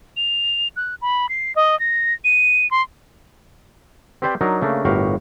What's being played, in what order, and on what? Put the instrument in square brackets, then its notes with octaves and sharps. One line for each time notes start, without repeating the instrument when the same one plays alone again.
[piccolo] F7
F#6
B5
C7
D#5
A#6
D#7
C6
[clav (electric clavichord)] C4 G4 B4 C5 D5 G5
F#3 D4 D#4 A#4
C#3 A3 A#3 D4
G1 A2 F#4 G4 A#4 F5